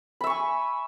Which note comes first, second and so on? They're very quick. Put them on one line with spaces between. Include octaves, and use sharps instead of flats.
B5 E5 C#6 G#5